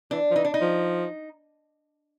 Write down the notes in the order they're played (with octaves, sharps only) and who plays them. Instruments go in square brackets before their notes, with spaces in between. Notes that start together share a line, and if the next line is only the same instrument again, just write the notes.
[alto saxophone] E3 [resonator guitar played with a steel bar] D4
[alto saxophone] F3
[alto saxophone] E3 [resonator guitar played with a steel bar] D#4
[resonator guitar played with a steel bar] D4
D#4
[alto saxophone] F3